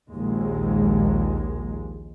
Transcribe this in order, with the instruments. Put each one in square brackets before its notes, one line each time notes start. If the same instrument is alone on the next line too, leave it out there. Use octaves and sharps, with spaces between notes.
[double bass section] A#1 D#2 G#3